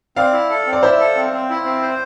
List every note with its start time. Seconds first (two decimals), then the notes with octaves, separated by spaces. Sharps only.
0.16 C4 D5 F5
0.33 E4
0.50 A4
0.67 C4
0.73 D5
0.82 E4 C5 E5
1.00 A4
1.16 C4
1.33 C4
1.50 E4
1.66 C4
1.82 C5